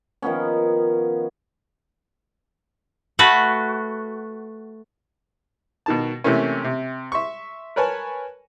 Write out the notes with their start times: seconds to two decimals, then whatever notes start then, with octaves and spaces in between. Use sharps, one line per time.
0.22 D#3 F3 B3 C#4
3.19 A3 F#4 B4
5.86 B2 D#3 A5
6.24 C3 E3 A3 A#3 C#4
6.64 C3
7.12 E5 C6 C#6
7.76 A#4 B4 C#5 G#5 A5